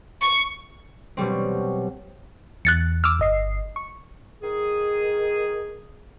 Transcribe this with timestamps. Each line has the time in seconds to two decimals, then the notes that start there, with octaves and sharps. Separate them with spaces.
0.22 C#6
1.17 B2 F#3 G3 C4
2.65 E2 F#6 A6 C#7
3.04 D6 E6 F6
3.19 G1 D#5 C7
3.76 C#6
4.41 D#3 G#4